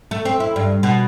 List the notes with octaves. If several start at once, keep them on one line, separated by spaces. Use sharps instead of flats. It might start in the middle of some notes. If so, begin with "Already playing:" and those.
A3
C4
E4
G2
B2